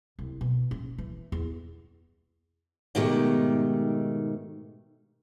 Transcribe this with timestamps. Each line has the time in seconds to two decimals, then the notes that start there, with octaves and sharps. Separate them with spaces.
0.19 C2
0.41 B2
0.71 C#4
0.98 E3
1.32 E2
2.95 G#2 B2 D#3 A3 G4